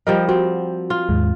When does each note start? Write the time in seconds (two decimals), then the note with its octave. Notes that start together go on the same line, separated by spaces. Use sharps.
0.07 F3 G3 A#4 D#5
0.29 C4 F#4
0.90 F4
1.09 D#2 G#2 G#3